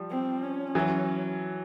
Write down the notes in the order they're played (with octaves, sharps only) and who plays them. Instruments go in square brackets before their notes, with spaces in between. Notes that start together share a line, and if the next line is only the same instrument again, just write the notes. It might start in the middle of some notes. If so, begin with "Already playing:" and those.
Already playing: [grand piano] F3 G3
[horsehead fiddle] C4
C#4
[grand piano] E3 F#3